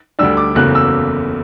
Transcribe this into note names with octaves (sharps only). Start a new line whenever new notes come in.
D2 D3 G3 D4 E6
D6
F#1 E2 C#3 F#3 A3 F#6
E6